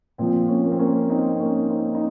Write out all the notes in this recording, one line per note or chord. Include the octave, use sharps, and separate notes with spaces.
A#2 F3 C4
A#3 C#4
A#3
C4
A#3 C#4
C4 D#4
A#3 C#4
C4 D#4
D#4